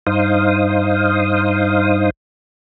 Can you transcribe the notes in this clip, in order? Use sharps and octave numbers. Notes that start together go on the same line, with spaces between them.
G2 D#4 C5 F5 D#6